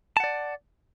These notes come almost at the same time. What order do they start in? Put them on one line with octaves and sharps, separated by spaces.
A5 F#5 D5